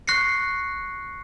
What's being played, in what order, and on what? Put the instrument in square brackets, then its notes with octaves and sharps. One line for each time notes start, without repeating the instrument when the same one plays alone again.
[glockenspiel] C#6 F#6 A#6 C7 C#7